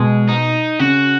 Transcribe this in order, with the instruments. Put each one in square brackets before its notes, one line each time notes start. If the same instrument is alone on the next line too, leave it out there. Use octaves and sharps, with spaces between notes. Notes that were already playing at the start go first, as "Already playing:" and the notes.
Already playing: [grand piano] B2 [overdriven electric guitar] G#3
[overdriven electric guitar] D#4
[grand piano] C#3 [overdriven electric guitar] F#4